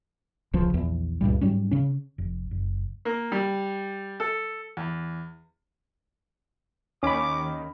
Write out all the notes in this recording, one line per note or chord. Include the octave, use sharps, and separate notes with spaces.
D1 C#2 C#3 F3
A#1 E2
C#2 G2 A#2 G3
G#2 F#3 G3 C#4
C#3 C#4
F1
F#1
A#3
G3
A4
E2
D#2 D#3 C#4 B5 D6